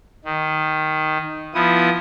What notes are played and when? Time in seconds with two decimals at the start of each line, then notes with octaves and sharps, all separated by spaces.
0.25 D#3
1.54 F3 B3 E4 D#6